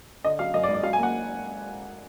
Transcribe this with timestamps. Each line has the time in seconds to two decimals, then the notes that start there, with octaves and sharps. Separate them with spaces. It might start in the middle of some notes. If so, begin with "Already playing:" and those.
0.24 D3 D#5
0.39 F#3 F5
0.54 F#2 D#5
0.64 D5
0.68 G#1
0.74 D5
0.83 F#3 F5
0.93 G#5
0.98 A#3 F#5